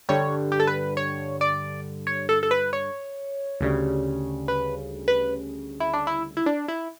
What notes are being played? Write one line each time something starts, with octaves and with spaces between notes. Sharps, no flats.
G2 D3 G3 C#5
G4
A4
B4
C#5
D5
C#5
A4
A4
B4
C#5
D2 C#3 G3
B4
B4
E4
D4
E4
E4
D4
E4